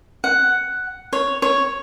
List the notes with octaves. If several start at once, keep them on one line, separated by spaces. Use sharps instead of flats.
F#5
C#5
C#5